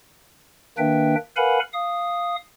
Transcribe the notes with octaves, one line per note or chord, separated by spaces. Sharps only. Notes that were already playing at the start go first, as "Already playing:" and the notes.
D#3 A#3 D4 B4 E5 G5
A#4 B4 F5 F#5 G#5 B5
F5 D#6